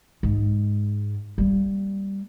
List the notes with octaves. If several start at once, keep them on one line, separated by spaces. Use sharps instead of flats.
G#2 G#3
G3 A#3